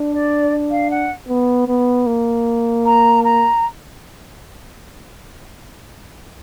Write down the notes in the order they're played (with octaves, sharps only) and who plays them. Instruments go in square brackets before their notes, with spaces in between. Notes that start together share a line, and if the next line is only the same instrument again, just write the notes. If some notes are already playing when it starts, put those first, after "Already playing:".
Already playing: [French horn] D4
[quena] D5
F5
F#5
[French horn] B3
B3
A#3
[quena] A#5
A#5